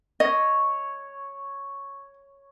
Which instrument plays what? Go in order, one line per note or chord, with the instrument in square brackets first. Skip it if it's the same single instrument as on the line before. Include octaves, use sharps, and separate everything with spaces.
[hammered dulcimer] C#5 [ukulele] D#5